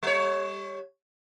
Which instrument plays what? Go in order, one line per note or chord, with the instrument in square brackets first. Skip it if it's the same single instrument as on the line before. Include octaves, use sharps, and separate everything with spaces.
[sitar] G3 C#5